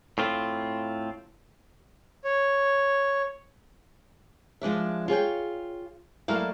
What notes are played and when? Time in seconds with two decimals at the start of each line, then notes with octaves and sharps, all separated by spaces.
0.18 A2 C4 F4
2.24 C#5
4.62 F3 G#3 D4 E5
5.08 F4 G#4 C#5 G5
6.28 F#3 A3 A#3 E4 D5 F5